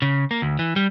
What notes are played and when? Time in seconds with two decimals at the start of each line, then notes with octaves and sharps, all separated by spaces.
0.02 C#3
0.31 A#3
0.42 D2
0.59 E3
0.76 G3